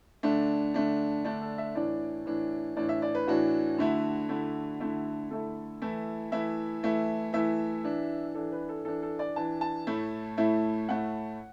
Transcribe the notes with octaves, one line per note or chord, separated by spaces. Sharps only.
D3 A3 D4
D3 A3 D4
D3 A3 D4 D5
A4
E5
A2 E3 D4 D5
A2 E3 D4
A2 E3 D4 D5
E5
D5
B4
A2 E3 D4 F#4
D3 A3 E4
D3 A3 E4
D3 A3 E4
D3 A3 E4 A4
E3 A3 E4
E3 A3 E4 E5
E3 A3 E4
E3 A3 E4 E5
E3 D4
E3 D4 A4
B4
A4
E3 D4 A4
A4
D5
E3 D4 A5
A5
A2 A3 E4
A2 A3 E4
A2 A3 E4 F#5